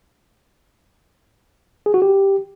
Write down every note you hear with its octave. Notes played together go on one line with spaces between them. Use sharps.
G#4
F#4
G4